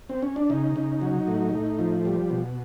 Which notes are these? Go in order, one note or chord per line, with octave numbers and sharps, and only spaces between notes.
C4
C#4
D4
C#3 D#4
C#3
F#3
A2
A2
F3
G3
B2